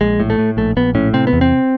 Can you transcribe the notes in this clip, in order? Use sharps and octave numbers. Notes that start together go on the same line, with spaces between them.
A#1 G#3
A2
A3
A2
A#1 A3
A#1 B3
A2 C#4
C3 C4
B3
E2
C4